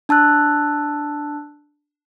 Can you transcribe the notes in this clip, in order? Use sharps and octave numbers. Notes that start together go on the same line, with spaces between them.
D4 A5 E6 F#6